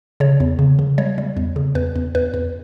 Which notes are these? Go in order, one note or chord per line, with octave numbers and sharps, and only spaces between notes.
C#3 C#5
E2
C#3
C#3
G3 C#5
G3
E2
C#3
E2 B4
E2
E2 B4
E2